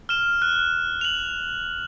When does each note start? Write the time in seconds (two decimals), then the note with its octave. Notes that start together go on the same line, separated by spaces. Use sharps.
0.09 F6 E7
0.42 F#6
1.01 F7 F#7